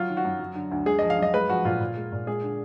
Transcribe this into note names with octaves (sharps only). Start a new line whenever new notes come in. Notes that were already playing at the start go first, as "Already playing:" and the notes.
Already playing: F#3 F4
D#3
F#4
F#2
F#3
D3
D2
G#3 G#4
D#5
F3
F5
F#2 D#5
G#3 B4
F3 F#4
A#2 F4
A#2
G#3
A#2
G#3 G#4
D3